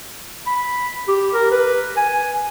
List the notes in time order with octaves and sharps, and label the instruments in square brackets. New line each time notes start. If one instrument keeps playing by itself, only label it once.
[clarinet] B5
G4
A#4
B4
G#5